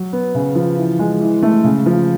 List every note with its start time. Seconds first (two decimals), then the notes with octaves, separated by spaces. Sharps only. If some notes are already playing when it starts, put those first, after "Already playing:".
Already playing: F#3
0.13 B3
0.35 C#3
0.55 F3
0.78 E3
0.99 G#3
1.21 E3
1.43 A3
1.64 C#3
1.86 F3